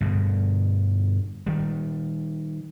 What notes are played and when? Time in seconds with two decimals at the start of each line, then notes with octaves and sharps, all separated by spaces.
0.01 G2 B2 D3
1.46 D#3 G3